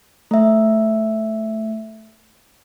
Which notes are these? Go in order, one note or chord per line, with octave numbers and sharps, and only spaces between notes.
A3 E5